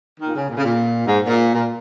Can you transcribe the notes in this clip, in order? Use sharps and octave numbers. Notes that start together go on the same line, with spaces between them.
D#3
A#2
C#3
A#2
C#3
A#2
G#2
A#2
A#2